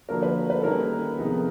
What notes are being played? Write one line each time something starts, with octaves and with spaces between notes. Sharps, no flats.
D3 F3 A#3 D4 F#4 A#4
B4
B4
A4
D#3 G3 A#3 C#4 A#4
C3 F3 G#3 B3 D#4